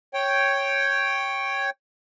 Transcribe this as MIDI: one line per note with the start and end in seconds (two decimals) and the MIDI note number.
0.14 1.70 73
0.14 1.70 79